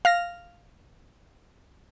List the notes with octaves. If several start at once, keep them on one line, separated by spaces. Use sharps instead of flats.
F5 F6 A#6